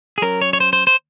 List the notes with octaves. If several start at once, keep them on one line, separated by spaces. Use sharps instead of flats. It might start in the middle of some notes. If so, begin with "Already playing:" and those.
G#4
F#3 C#4 A#4
C#5
C#5
C5
C5
C5